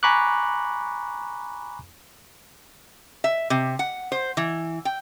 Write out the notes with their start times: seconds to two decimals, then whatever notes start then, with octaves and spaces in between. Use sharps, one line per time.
0.03 G#5 A#5 B5 C#6 D6 F#6
3.24 E5
3.50 C3
3.79 F#5
4.12 C5
4.37 E3
4.85 G5